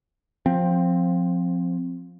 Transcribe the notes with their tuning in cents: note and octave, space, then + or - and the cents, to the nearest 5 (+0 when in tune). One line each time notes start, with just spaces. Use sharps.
F3 +15 C4 +0